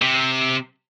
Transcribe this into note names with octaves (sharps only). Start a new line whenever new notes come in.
C3